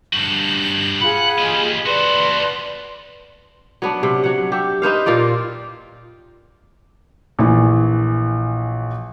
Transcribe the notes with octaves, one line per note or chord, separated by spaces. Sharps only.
G2 F#4 G6
F4 G#4 F#5 B5
G4 D#5
F#4 A4 B4 D5 C6
F#3 B3 D4
C3
F#3 F#5
G4 E5
D#4 B4 C5 F5
A#2 A#3 F4 D5
A#1 E3